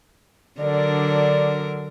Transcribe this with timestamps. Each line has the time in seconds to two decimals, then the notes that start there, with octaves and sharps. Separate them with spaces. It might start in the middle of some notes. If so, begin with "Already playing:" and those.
0.59 D3 F#3 D4 A#4 D5